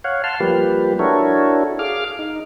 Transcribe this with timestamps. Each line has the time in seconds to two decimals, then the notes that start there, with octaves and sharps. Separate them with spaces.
0.04 C#5 F5 F#5
0.24 F5 A5 C6 F6
0.40 F3 G3 A#3 G4 B4
0.99 D4 E4 F#4 A4 A#4 C#5
1.79 G#4 F5 D6 F6
2.19 D#4